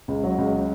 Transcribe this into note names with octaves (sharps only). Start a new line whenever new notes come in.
C#2
F#3
C#2